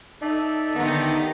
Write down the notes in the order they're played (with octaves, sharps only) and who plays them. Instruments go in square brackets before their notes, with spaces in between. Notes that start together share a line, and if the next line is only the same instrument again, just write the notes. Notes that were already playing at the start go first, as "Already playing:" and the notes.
[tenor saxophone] D#4 [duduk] A4 [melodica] D5 E5 A5
[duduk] D3 [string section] D#3 D#4 G4 [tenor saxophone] B3